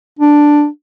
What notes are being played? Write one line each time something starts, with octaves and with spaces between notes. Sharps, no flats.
D4